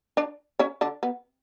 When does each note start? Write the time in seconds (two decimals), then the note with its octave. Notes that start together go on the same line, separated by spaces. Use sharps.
0.17 D4 D5
0.59 C#4 C#5
0.81 D3 D4
1.03 B3